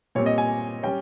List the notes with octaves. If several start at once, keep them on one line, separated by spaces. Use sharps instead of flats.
A#2 G3 C4 C#5
D#5
G#5
G3 C#4 G5